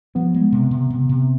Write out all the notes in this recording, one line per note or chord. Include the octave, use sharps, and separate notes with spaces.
F3 B3
G#3
C3
C3
C3
C3